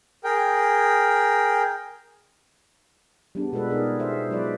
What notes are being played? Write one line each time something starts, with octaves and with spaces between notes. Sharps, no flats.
G#4 A#4 G5
G3 B3 D4 G#4
B2 G#3 F4 A4 B4
D#4 G#4 A#4
G#4 C5 E5
F#3 G#3 F4 B4 D5